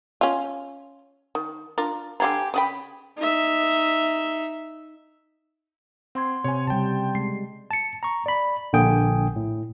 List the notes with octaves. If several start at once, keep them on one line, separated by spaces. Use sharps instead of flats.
C#4 F4
D#3
D4 F4 A#4
D3 G4 F5 G#5 A#5 C6
C#3 F#4 G5 B5 D#6
D#4 E5
C4 F#5 C6 G#6
C3 C#5 G#5
C#3 G3 G5 A5
G#3 C7
A5 C#7
A#5 C#6
D5 B5
A#1 D3 A#3 G5 G#5 D#6
A2